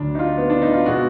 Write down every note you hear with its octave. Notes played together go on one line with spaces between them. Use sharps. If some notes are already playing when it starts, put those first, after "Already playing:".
Already playing: D2 D3 F#3 D4
D#4
F4
B3
D4
D#4
F4
B2 G#3 B3 F#4